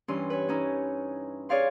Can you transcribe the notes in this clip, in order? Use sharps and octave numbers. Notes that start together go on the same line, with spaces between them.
G2 E3 C#4 C6
B4 C#5
C#4 D#4 E4
G#4 C#5 D5 F5 C6